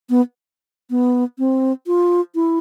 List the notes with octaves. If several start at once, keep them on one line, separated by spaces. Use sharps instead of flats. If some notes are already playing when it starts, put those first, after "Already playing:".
B3
B3
C4
F4
E4